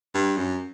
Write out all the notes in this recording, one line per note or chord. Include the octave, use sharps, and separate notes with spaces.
G2
F#2